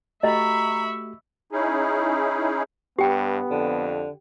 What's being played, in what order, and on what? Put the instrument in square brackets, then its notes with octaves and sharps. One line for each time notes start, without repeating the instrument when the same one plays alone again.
[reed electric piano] A3 F#4 G4 [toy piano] D#5 [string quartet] E5 B5 C#6 [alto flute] A#5
[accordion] C#4 D#4 E4 G#4
[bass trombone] G2 [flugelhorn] B3 [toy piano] G4 G5
[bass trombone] F2 [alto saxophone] D3